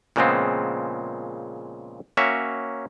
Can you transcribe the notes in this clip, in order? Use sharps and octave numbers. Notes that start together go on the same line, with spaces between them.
A#2 C#3 F3 G#3 B3 C4
A#3 C#4 F#4 C#5 E5